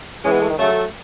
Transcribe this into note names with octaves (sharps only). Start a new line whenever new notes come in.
E3 G#3 C#4
B3
A3
D#3
C#3 F#3 A3